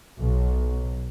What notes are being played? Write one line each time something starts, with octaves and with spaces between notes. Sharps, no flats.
B1